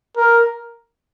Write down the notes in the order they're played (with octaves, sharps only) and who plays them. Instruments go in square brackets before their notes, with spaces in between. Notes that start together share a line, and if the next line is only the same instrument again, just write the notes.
[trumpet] A#4